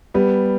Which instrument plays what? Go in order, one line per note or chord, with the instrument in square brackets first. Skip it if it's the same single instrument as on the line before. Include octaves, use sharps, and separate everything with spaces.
[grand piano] G3 B3